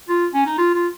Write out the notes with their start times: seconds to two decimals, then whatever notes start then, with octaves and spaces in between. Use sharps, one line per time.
0.09 F4
0.34 C#4
0.46 D#4
0.58 F4
0.74 F4